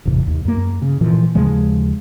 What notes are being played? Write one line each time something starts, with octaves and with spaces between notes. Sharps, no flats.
D1 G1 E2 C3
D#2
F#2 A#3
C#3
A#2 E3 F3
D#2 C#3 F3 G#3